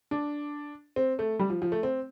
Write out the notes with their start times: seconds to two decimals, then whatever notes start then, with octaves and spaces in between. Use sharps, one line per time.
0.11 D4
0.96 C4
1.19 A3
1.39 G3
1.50 F3
1.62 F3
1.72 A3
1.83 C4